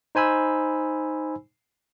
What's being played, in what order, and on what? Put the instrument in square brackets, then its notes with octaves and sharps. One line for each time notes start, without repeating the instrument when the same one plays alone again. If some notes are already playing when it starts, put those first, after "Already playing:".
[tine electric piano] D#4 C5 G#5 B5 E6